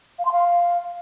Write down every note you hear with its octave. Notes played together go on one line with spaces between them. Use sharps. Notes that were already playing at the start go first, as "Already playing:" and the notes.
F5
C6
F5